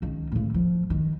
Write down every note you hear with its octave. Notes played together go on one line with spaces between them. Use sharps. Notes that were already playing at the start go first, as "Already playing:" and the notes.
C#2 D#3
A2 C#3
F3
D#3